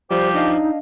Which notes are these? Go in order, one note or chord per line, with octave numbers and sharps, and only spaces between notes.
F3 G3 G4 C5
D4 D#4 D#5 F5